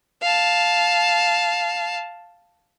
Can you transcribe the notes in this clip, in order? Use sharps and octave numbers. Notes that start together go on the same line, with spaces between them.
F5 A5